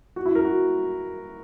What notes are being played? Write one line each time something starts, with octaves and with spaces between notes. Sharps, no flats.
F#4
E4
A#4
F#4